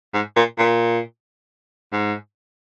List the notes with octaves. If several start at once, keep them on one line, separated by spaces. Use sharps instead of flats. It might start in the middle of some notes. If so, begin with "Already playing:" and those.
G#2
A#2
A#2
G#2